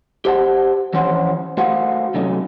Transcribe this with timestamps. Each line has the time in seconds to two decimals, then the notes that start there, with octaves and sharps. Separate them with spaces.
0.25 G4 C5 F#5 A5
0.94 E3 F3 C#4 C5 F#5
1.57 A3 F#4 A#4 C5 F5 F#5
2.14 C3 F#3 A3 C#4 D#4